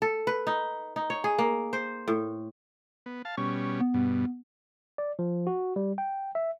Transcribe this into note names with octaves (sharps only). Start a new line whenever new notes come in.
A4
B4
D#4
D#4
C#5
G#4
A#3
C5
A2
B3
F5 A5
B2 G3 C#4 C#6
B3
G2 B2
D5
F3
F#4
G3
G5
E5